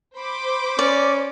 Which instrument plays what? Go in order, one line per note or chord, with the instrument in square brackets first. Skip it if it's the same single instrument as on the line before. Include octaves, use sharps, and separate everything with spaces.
[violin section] C5 B5 D6
[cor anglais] C#4 [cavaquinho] D5